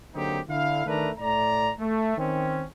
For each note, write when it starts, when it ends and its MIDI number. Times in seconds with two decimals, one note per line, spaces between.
0.14 0.40 50
0.14 0.40 54
0.14 0.40 58
0.14 0.40 60
0.14 0.40 63
0.14 0.40 67
0.48 0.85 50
0.48 0.85 64
0.48 0.85 77
0.86 1.09 51
0.86 1.09 57
0.86 1.09 62
0.86 1.09 70
0.86 1.09 71
0.86 1.09 82
1.19 1.71 45
1.19 1.71 57
1.19 1.71 74
1.19 1.71 82
1.79 2.16 57
2.17 2.63 51
2.17 2.63 60
2.17 2.63 61